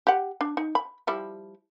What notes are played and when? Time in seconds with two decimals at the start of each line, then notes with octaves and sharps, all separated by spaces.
0.07 G4 F#5
0.41 D4
0.57 D#4
0.75 B5
1.07 F3 G3 E4